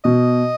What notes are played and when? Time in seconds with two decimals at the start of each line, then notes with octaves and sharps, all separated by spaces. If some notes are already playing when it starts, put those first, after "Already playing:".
0.04 B2 D#5